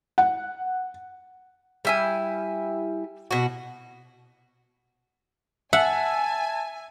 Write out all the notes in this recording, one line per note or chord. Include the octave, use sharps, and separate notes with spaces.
F#5
G3 E4 G#5
B2 F#4
E5 F#5 G#5 A5